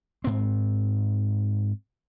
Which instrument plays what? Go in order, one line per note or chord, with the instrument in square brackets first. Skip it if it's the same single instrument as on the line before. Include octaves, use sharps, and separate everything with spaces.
[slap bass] G#2 C4